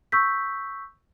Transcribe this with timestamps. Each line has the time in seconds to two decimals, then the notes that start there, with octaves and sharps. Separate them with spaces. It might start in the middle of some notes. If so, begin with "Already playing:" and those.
0.12 C#6 E6 G6 B6